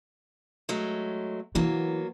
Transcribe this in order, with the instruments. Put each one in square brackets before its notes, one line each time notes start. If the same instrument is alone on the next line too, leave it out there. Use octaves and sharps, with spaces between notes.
[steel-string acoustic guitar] F#3 G#3 A3
[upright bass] E3 [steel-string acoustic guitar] F#3 A#3 B3